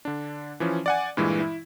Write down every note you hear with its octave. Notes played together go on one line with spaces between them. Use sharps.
D3 D4
E3 F3 C#4
D5 F#5 G#5
G2 A#2 E3 G#3
E4